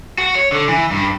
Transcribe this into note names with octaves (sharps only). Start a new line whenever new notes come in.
F#4
C#5
D3
E3
G2